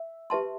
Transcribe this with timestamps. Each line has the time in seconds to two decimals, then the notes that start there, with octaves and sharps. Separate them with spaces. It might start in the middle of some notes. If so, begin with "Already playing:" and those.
Already playing: E5
0.30 G4 B4 E5 A5 C6